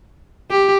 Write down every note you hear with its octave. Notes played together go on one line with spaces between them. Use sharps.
G4